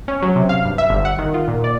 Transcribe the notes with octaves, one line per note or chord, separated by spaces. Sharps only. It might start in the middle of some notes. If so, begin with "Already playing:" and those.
C#4
F#3
C3
F5
G2
E5
G1
F#5
D#3
F4
A#2
D5